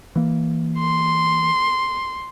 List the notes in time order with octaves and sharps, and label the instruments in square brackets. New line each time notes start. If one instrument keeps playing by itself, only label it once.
[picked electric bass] E3 A#3
[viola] C6